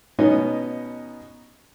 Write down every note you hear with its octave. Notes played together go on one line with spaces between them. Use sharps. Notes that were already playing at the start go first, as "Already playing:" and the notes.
B2 B3 C#4 D#4 D#5